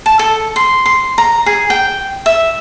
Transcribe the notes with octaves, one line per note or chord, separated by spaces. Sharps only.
A5
A4
C6
C6
A#5
G#4
G5
E5